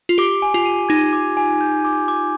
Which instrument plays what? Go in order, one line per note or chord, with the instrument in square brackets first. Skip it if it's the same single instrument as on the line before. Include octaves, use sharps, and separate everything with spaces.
[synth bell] F4
[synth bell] G4 [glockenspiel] D6
[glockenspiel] G#5
[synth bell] F4
[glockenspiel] D#7
[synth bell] D#4 [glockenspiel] G#6
[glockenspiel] D6
G#5
G6
D6
D6